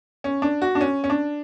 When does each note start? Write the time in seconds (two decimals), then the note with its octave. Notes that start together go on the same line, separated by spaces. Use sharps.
0.24 C#4
0.42 D4
0.62 F#4
0.75 D4
0.81 C#4
1.04 C#4
1.10 D4